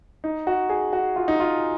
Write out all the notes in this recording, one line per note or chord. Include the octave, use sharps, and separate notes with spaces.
D#4
F#4
G#4
F#4
F4
D#4
F4